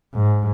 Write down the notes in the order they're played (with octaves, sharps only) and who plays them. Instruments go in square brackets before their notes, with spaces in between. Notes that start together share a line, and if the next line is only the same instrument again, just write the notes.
[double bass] G#2